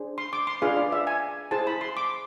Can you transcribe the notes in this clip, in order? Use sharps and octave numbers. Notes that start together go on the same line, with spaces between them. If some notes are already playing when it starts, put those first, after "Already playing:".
Already playing: D4 G#4 C5
C6
D6
C6
D4 F4 G#4 B4 F5
D5
E5
G#5
E4 G#4 C5 A5
B5
C6
D6